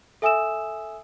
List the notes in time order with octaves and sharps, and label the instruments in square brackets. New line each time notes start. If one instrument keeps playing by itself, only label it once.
[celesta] A4 E5 G#5 D#6 E6 E7